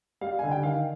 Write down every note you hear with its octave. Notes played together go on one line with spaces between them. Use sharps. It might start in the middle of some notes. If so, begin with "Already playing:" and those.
G3 F5
D3 G#5
G5
D#3 F5